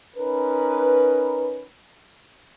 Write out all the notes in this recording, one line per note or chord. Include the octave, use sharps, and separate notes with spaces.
C#4 D#4 A#4 B4